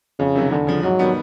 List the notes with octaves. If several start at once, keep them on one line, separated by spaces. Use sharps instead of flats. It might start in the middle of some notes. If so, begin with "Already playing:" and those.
F2 C#3
C3 D#3 F#3
E2 D3
C#3 F3
G#2 F#3
D#3 G3 B3